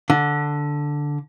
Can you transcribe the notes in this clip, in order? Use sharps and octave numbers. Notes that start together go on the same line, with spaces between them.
D3